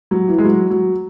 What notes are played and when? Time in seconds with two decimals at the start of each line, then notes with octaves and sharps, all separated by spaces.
0.11 F#3
0.28 E3
0.38 G#3
0.45 F#3
0.70 F#3